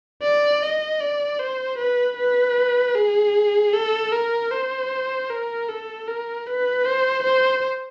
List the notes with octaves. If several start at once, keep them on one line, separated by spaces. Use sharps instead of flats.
D5
D#5
D5
C5
B4
B4
G#4
A4
A#4
C5
A#4
A4
A#4
B4
C5
C5